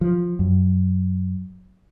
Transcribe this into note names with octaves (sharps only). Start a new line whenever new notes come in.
F3
F#2